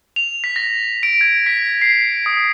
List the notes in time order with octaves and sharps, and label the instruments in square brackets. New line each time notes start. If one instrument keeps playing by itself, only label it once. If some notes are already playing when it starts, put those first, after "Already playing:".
[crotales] F7
B6
A#6
D7
G#6
B6
C7
D#6